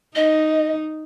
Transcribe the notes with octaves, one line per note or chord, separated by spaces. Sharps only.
D#4 D#5